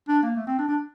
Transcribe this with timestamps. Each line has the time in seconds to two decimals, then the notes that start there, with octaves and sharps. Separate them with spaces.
0.08 D4
0.23 A#3
0.36 A3
0.47 C4
0.58 D4
0.69 D4